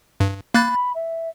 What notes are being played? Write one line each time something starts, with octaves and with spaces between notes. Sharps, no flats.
G2
A#3 B5 F#6 A6
E5